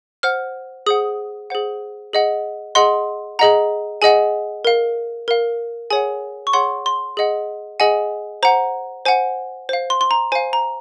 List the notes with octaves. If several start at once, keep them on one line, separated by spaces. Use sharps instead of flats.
C5 F#5 F6
G#4 C5 F#5 D#6
G#4 C5 F#5
G#4 D#5 F#5
G#4 D#5 F#5 C6
G#4 D#5 F#5 A#5
G#4 D#5 F#5 G#5
A#4 F5
A#4 F5
G#4 C#5 F#5 G#5
C#6
G#4 C#5 F#5 C6
C6
G#4 D#5 F#5
G#4 D#5 F#5 G#5
C5 F#5 A#5
C5 F#5 G#5
C5 F5
C6
C6
A#5
C5 F5 G#5
A#5